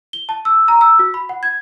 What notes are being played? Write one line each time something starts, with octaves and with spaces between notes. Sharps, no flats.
G7
A5
E6
A#5
E6
F#4
B5
F#5
G#6